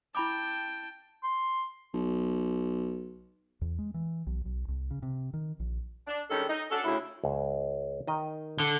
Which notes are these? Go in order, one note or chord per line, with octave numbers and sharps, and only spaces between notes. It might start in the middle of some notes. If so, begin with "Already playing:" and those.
E4 G5 A5 B5 D6
C6
B1
E2
G#3
E3
B1
B1
C2
C#3
C3
D#3
A#1
D4
D#3 G3 G#3 C#4 D4 A4
D#4
C#4 D4 F#4 A4
D2 C#3 E4
C#2
D#3 D#5
D3